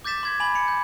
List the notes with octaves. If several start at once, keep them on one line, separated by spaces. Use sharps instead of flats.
D6 G6 A6 B6 E7
C6 G#6 B6
G#5 B5 F#7
B5 C#7
G6